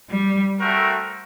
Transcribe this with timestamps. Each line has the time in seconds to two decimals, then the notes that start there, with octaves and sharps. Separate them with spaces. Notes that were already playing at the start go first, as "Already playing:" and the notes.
0.10 G3
0.60 A3 C4 F#4 A#4